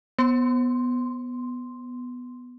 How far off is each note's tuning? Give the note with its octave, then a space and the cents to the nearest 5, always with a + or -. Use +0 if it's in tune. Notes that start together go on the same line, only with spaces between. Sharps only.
B3 +0 C6 +0